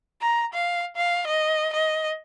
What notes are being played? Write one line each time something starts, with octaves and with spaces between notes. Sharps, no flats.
A#5
F5
F5
D#5
D#5